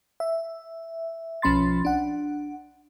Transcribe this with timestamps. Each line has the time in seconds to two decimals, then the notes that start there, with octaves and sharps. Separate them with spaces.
0.20 E5
1.42 B1 F3 C#4 B5 C6 A6
1.85 D4 F#5